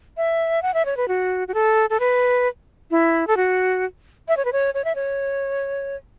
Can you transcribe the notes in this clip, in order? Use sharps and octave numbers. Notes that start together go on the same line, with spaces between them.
E5
F#5
E5
C#5
B4
F#4
F#4
A4
A4
B4
E4
A4
F#4
E5
C#5
B4
C#5
C#5
E5
C#5